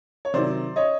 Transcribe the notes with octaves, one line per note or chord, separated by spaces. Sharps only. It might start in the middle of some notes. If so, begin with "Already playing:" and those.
C#5
C3 D#3 F#3 C5 D5
C#5 D#5